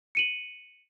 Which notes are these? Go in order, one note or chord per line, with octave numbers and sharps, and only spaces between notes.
C#7 D#7 F#7